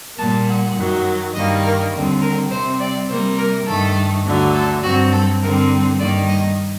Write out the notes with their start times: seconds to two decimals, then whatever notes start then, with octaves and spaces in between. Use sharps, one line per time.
0.18 A#2 G3 A#3 A5
0.47 F#5
0.76 F#2 D#3 F#3
1.34 G2 D#3 G3 A#3 D#5
1.63 A#4
1.92 D#2 D3 G3 C4
2.21 A#4
2.50 C3 G3 C4 C5
2.79 D5
3.09 C3 G3 A#3 C5
3.38 A#4
3.67 G2 D#3 A3 A4
4.25 D2 D3 F#3
4.54 A4
4.83 G2 F#3 C4 F#4
5.12 A4
5.41 G2 D3 G3 C4 A#4
5.99 G2 D#3 G3 A#3 D5
6.29 D#5